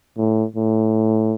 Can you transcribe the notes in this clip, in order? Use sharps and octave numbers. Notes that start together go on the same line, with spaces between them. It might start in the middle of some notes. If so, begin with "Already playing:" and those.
A2
A2